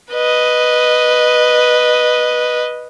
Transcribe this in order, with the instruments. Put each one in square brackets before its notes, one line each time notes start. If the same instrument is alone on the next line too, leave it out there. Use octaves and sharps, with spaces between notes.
[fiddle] B4 D#5